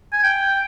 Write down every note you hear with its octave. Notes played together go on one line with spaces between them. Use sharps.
G#5
G5